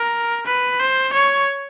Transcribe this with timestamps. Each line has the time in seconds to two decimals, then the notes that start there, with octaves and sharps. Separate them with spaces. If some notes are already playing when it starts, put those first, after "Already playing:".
Already playing: A#4
0.46 B4
0.80 C5
1.13 C#5